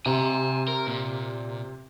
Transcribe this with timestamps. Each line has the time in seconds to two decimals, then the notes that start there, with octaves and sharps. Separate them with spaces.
0.06 C3 G#5 A#5
0.68 A#4
0.87 A#2